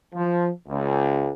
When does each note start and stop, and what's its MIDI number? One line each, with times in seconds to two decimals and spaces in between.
0.14 0.49 53
0.68 1.31 37